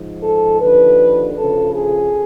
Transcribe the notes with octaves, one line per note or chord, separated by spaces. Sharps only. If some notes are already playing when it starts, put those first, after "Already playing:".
Already playing: G#2 F3
A4
D#2 D3 F3 B4
D2 C#3 F3 A4
G#4